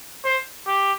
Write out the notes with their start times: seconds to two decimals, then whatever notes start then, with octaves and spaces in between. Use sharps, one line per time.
0.25 C5
0.67 G4